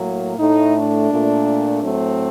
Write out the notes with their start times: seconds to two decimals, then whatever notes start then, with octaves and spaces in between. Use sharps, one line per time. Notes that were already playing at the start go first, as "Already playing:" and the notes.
Already playing: A2 F#3 A#3
0.39 A2 A3 D#4
0.75 D4
1.11 A#2 A3
1.84 A2 F#3 A3 C4